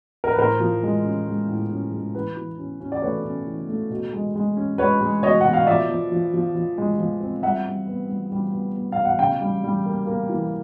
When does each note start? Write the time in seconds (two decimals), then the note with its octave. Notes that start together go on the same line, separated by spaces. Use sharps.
0.24 A#4
0.32 B4
0.38 A2 A#4 C5
0.60 F3
0.83 G#3
1.05 C#4
1.27 G#3
1.48 A2
1.70 C#4
1.92 G#3
2.15 E3 B4
2.37 E3
2.58 C#4
2.80 C#4
2.92 D5
3.02 A3 B4 C#5
3.25 C#4
3.47 E3
3.69 A3
3.90 B2
4.13 G#3
4.35 G#3
4.57 C#4
4.78 G#3 B4 C#5
5.01 G#3
5.22 B2 C#5 D#5
5.41 B2 F#5
5.53 F5
5.67 F3 D5 E5
5.90 F3
6.12 F3
6.34 F3
6.55 F3
6.78 G#3
6.99 F3
7.21 C4
7.43 G3 E5 F#5
7.66 G3
7.87 B3
8.09 G3
8.32 G3
8.53 B3
8.75 B3
8.92 F5
8.97 B2
9.05 F#5
9.19 C#3 F5 G5
9.41 G3
9.64 G3
9.86 A#3
10.07 A#3
10.29 E3